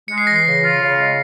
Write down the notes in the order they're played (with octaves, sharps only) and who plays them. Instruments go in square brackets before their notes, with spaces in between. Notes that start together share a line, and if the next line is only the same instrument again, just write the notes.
[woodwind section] G#3 [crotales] C#7
[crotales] C7
[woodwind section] E3 [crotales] A#6
[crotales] C7
[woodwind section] C#3
F4
C#3
G#3